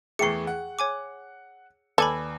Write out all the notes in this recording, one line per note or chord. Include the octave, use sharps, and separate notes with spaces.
E2 E3 A3 G#4 G5 C#6 C7 C#7
F#5
C#5 G#5 D6
D#2 A4 B4 D5 G#5 B5 D6